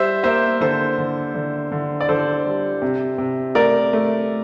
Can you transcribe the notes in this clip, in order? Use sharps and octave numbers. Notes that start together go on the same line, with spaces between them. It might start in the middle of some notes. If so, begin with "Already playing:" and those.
Already playing: G3 C5 E5
A#3 C5 E5
D3 A4 C5
D3
D3
D3
D5
D3 A4 C5
G3
C3
C3
A3 A#4 D5
A3